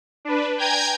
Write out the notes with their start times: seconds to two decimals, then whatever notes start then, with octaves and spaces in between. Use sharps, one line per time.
0.25 D4 B4
0.58 G5 G#5 A#5 G6 G#6